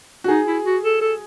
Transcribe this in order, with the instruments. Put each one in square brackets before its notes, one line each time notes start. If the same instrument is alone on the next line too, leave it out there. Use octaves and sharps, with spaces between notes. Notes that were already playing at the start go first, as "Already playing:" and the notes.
[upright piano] F#4
[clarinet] D#4 [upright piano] G#4
[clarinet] E4
F#4
A4
A4